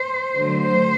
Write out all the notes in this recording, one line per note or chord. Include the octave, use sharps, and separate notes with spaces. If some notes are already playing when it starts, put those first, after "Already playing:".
Already playing: C5
D3 F#3 A3
C5